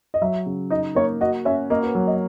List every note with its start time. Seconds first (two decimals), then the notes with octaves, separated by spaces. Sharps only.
0.14 D#5
0.21 F#3 E5
0.46 C#3
0.70 D#4 D#5
0.95 A#3 C#5
1.21 F#4 D#5
1.45 C#4 E5
1.70 A#3 D#5
1.83 B4
1.95 F#3
2.07 D#5